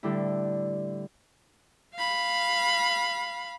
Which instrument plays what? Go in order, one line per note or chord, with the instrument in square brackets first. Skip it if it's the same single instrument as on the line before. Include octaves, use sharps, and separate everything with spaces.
[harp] A2 D3 G3 E4
[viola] F5 B5